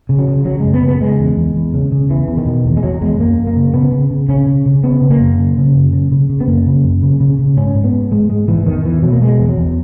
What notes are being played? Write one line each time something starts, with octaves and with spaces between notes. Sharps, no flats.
C#3
F#3
C#3
C#3 F#3
F#2 G#3
B3
C#3
B3
C#3 G#3
E2
E2
E2
C#3
C#3
E2 E3
E2
D#3
B2
E2
G#3
E2 F#3
E2 G#3
F#2 A#3
F#2
A#3
C#3
C#3 B3
C#3
C#3
C#3 C#4
C#3
C#3
C#3 B3
C#3
A#3
F#2
C#3
C#3
F#2
C#3
C#3
C#3
B3
F#2 A#3
C#3
F#2
C#3
C#3
C#3
G#2 C#4
G#2
B3
G#2
G#2 G#3
G#2 G#3
G#2 E3
E2 D#3
E2 E3
B2 F#3
A#3
B2 G#3
E2
F#3
E2